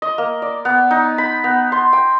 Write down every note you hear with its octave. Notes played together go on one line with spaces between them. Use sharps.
D#5
A#3
D5
B3
D#4
B5
B3
C6
G5